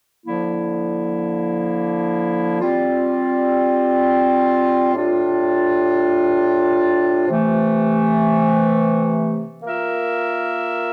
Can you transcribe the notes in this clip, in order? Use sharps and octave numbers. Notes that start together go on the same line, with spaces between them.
D3 F3 A#3 E4
G3 C4 F4
A2 G3 D4 F4
C3 E3 A3
A#3 F4 A#4 E5